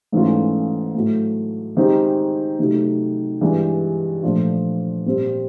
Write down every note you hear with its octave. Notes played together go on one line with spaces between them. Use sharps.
G#2 E3 A3 C#4 F4
A2 F#3 A3
D#3 G#3 C4 D#4 G4
C3 D#3 F#3 A3
G2 E3 G#3
A#2 F3 A3 D4 F4
A#2 G3 C4